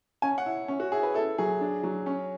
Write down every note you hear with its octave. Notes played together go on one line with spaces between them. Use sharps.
C#4 G#5
F#5
E4
C#4
F#4
E4 G#4
B4
E4 A4
F#3 G#4
D4
F#3
C#4